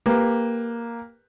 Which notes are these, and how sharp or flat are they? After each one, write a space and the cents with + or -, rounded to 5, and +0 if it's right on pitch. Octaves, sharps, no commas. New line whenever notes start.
A#3 +0 G4 +15 B4 +0